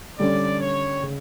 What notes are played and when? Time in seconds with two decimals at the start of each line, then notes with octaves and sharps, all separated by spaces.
0.19 D3 G3 C#4 D5
0.60 C#5
1.03 C#3